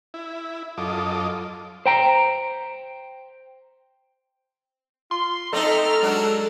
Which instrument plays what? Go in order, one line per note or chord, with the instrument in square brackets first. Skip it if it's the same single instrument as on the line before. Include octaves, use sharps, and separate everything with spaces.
[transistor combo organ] E4
F#2 F4 A4 D#5 D6
[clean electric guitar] C5 G5 A#5
[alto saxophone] F4 [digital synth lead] C6
[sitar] A3 C4 D#4 [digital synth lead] A4 [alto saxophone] D#5 [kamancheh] A#5 F6
[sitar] F#3 D4 F#4 [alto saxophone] G#3